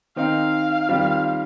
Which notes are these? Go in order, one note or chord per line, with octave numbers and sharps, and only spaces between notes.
D#3 C4 D#4 F5
D#3 G3 C4 F4